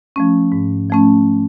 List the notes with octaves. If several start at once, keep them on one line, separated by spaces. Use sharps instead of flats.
F3 A3 C#4
G#2
F3 A3 C#4